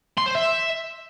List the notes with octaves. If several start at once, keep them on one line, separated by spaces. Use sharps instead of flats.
C6
C5
E5